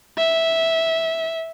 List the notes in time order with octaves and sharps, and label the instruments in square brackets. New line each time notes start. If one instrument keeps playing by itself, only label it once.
[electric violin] E5